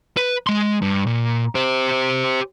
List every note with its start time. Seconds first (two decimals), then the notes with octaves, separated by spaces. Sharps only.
0.17 B4
0.47 G#3 C6
0.82 G2
1.07 A#2
1.55 G4 C5